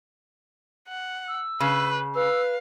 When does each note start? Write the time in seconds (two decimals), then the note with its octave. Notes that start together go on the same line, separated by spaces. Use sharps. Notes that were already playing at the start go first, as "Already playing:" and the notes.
0.88 F#5
1.28 E6
1.60 C#3 B4
2.15 B4 F5 E6